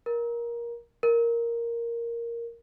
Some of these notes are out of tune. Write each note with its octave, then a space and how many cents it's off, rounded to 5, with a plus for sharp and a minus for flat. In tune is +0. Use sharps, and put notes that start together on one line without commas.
A#4 +20
A#4 +0